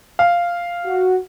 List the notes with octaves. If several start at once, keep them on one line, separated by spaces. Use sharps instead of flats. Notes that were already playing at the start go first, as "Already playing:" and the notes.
F5
F#4